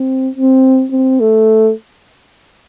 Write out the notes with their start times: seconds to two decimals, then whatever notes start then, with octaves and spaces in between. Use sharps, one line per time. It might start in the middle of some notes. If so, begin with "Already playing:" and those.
Already playing: C4
0.35 C4
0.92 C4
1.20 A3